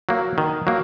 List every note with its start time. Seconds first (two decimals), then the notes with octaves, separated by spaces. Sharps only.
0.09 F#3 A#3
0.38 D#3
0.67 F#3 A#3